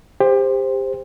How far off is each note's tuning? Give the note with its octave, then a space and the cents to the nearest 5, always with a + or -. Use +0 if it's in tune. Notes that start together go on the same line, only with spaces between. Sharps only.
G4 +25 C5 +0